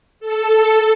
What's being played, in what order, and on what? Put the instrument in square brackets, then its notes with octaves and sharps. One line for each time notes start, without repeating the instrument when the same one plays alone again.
[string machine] A4